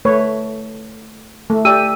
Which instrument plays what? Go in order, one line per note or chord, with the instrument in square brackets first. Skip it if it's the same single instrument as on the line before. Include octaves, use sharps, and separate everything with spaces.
[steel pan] A3 B4 C#5
A3
[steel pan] G4 D5 [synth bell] E6 D#7